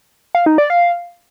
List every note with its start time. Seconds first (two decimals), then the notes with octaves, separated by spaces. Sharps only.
0.35 F5
0.46 D#4
0.58 D5
0.70 F5